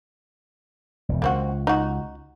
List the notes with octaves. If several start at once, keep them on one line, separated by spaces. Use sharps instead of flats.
E1 E2
C#2 A#3 C4 F#4
D#4 F#4